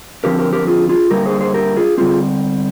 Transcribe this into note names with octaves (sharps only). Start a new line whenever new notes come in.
D3 F3 C4 G4 A#4
G4 A#4
G4 A#4
F4 G#4
F4 G#4
D3 G3 A#3 G4 A#4
G#4 C5
G#4 C5
G4 A#4
F4 G#4
D3 G3 C4 F4 G#4